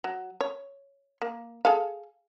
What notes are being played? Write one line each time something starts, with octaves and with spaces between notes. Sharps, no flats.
F#3
C#5
A#3
G#4 A4 F5